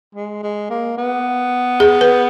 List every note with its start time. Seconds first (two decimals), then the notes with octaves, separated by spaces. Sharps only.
0.15 G#3
0.43 G#3
0.70 A#3
0.98 B3
1.80 G#4
2.01 B4